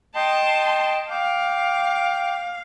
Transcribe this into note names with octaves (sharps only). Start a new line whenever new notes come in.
D#5 G5 A5 C6
F5 G5 D6